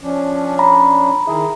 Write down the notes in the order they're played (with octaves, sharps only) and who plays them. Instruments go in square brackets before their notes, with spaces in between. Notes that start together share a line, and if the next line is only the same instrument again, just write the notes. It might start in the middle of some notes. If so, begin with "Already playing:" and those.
[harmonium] F3 C#4 D4
[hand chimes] A#5 B5
[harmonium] D#3 E4 G#4 [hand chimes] E5 A#5